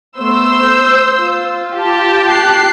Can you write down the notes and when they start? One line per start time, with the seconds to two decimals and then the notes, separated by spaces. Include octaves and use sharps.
0.18 A3 B3 C5 E6
0.64 G6
1.19 F4
1.76 G4 A5
2.30 F#6 C7